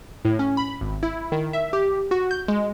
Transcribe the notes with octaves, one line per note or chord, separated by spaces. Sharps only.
A2
C#4
B5
G#1
E4
D#3
E5
G4
F#4
G6
G#3